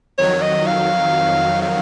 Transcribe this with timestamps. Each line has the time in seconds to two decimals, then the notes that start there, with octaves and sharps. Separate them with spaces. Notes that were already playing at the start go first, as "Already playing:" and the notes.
0.18 F2 D#3 F#3 C#5
0.42 D#5
0.67 F5
1.62 F5